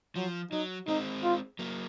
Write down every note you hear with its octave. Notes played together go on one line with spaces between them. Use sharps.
F3 F#3
F#3 D#4
G#3 C4 D#4
F4
F#3 A#3